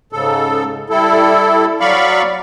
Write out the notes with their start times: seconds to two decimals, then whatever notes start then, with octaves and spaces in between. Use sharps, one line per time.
0.12 G#2 C#3 A4
0.90 G3 E4 A4
1.80 F#3 D5 F5 B5 C#6